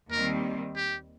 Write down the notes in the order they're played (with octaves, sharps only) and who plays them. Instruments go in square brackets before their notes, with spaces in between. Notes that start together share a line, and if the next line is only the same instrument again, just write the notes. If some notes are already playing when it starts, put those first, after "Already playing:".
[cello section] D#2 D#3 G3 C4 [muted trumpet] A#4
[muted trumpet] G4